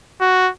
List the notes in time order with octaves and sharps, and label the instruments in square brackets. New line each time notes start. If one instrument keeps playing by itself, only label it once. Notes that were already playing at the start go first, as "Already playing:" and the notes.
[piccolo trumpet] F#4